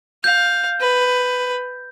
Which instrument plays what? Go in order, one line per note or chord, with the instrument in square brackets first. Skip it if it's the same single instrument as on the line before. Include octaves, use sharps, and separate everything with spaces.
[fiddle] F5 [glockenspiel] G6
[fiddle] B4